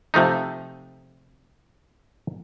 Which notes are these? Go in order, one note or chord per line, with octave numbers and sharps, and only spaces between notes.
C3 F3 A3 D#4